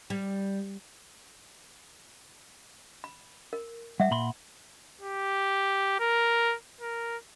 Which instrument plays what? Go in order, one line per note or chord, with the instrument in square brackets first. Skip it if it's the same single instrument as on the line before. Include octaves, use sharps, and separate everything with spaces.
[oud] G3
[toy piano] B5
A#4
[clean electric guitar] G3 [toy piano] E5 F#5
[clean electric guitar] A#2 B5 C6
[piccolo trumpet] G4
A#4
A#4